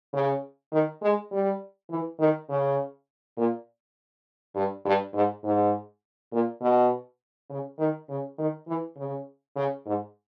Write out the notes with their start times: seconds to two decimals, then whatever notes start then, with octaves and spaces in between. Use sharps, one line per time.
0.14 C#3
0.72 D#3
1.02 G#3
1.32 G3
1.90 E3
2.20 D#3
2.49 C#3
3.38 A#2
4.55 G2
4.85 G2
5.14 G#2
5.44 G#2
6.32 A#2
6.62 B2
7.50 C#3
7.79 D#3
8.09 C#3
8.38 D#3
8.68 E3
8.97 C#3
9.56 C#3
9.85 G#2